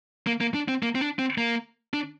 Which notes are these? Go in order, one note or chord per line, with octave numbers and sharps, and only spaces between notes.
A#3
A#3
D4
C4
A#3
C4
D4
C4
A#3
D4